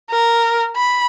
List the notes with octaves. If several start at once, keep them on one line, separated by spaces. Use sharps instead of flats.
A#4
B5